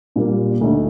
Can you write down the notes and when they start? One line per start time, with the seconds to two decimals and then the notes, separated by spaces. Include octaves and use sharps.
0.16 A#2 G3 A#3
0.61 D2 D3 A3 D#4